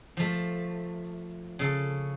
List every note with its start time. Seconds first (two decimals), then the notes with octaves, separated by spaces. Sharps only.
0.17 F3 A3
1.59 C#3 A4